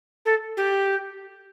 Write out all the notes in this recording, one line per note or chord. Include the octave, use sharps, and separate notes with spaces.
A4
G4